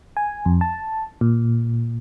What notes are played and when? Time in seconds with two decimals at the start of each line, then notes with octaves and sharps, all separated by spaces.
0.17 G#5
0.46 F2
0.61 A5
1.21 A#2